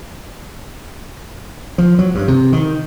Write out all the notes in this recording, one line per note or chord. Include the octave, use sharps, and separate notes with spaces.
F3
F#3
G2
C3
D#3